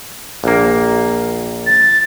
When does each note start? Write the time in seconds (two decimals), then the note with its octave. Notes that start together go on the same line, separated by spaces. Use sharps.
0.44 A#1 A#3
1.66 A6